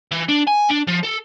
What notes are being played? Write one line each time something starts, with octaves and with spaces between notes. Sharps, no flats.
E3
D4
G#5
D4
F3
A4